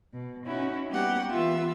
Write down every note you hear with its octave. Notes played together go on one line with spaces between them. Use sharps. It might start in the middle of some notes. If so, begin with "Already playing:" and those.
B2
C#4 D#4 E4 F#4
G3 A#3 B3 C#4 G4 F#5
E3 B3 F4 E5 E6